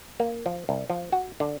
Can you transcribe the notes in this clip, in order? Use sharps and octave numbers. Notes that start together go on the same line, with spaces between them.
A#3
F3
C2
F3
F#4
D3